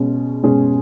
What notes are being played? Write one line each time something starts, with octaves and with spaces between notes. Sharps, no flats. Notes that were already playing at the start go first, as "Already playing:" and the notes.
Already playing: B2 G#3 C#4 G#4
B2 G#3 C#4 G#4